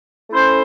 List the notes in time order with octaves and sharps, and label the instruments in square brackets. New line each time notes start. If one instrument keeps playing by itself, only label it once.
[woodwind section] A3 C#4 E4 A4 C5